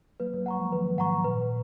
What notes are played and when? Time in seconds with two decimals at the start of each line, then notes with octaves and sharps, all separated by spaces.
0.20 F#3 A#3 B4
0.34 F#3 A#3
0.46 F#5 A#5 C#6
0.59 F3 G#3
0.72 D#3 F#3 B4
0.98 G#2 F#5 A#5 C#6
1.24 A#2 B4